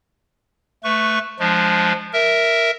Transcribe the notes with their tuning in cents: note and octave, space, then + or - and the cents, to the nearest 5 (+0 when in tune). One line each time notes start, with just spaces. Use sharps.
A3 +0 B4 +0 C#6 +0
F3 +0 G#3 +0 D4 +15
A#4 +0 E5 +0